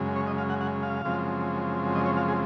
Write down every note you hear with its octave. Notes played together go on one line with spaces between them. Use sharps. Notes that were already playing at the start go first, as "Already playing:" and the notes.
Already playing: F#2 C#3 G#3
C#5
D#5
F5
F#5
F#5
F5
F#2 C#3 F3 G#3 C4
D#5
C#5
F5
G#4